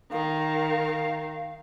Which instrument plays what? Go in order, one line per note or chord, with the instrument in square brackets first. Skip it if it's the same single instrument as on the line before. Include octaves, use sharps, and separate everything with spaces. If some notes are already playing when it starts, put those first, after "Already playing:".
[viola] D#3 [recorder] F5